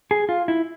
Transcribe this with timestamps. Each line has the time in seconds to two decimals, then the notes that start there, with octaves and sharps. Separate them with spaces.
0.11 G#4
0.29 F4
0.48 E4